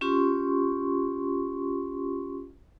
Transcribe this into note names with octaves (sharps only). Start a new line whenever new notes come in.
C#4 F4 G4 C6 C#6